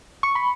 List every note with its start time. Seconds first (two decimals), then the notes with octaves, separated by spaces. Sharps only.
0.23 C#6
0.35 B5